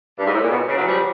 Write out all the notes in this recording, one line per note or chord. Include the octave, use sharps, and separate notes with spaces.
G2
G#2
A2
A#2
B2
C#3
E3 F#3
F3 G3